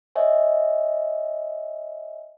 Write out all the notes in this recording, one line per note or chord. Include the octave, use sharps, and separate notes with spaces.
C#5 D#5 E5 G#5